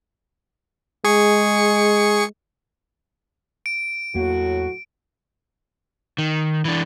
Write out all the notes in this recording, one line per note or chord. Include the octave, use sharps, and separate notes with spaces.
G#3 G#4 C#6 C#7
D7
E2 A2 F#3 A#3 F#4
D#3
E3 D4